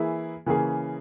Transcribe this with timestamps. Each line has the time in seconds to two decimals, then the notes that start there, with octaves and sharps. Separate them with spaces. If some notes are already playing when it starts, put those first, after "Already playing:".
Already playing: E3 A#3 E4 G#4
0.46 C#3 E3 A#3 C#4 G#4